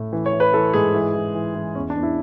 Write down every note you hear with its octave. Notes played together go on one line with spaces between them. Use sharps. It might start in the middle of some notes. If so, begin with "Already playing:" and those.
Already playing: A2
E3
C#5
E3
B4
E3 A4
G#2 G#4
E3
E3
E3
E3
E2 C#4
D4
E2
E4